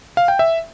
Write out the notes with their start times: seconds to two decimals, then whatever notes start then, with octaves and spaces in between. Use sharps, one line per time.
0.17 F5
0.28 G5
0.39 E5